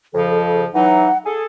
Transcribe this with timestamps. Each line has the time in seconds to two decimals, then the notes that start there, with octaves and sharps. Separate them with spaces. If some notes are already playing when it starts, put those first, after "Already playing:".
0.14 F2 C#3 F3 A4
0.74 E3 F#3 D#4 F#5
1.26 G#4 A4